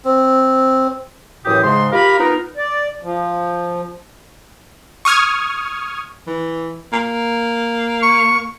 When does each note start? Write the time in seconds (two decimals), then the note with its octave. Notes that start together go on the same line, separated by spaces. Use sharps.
0.05 C4
1.45 F#2 A2 E3 G4 D#6
1.64 G#2 C#3 G#3 C6
1.92 F4 G4 A#4 F5 B5
2.20 B3 D#4 F4 A#4
2.57 D5
3.02 F3
5.05 C#6 D#6 F6 G#6
6.27 E3
6.93 A#3
8.03 C#6